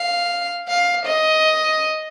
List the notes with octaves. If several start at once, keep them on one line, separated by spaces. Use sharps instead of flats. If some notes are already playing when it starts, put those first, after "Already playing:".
Already playing: F5
F5
D#5